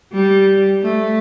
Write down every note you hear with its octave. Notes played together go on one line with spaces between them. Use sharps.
G3
A3